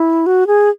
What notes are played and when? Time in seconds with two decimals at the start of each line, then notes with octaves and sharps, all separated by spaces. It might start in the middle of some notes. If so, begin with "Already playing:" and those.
Already playing: E4
0.26 F#4
0.47 G#4